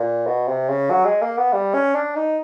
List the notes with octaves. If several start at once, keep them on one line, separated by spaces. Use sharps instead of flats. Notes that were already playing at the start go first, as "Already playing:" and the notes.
Already playing: A#2
B2
C3
C#3
F#3
G#3
A#3
B3
G3
C#4
D4
D#4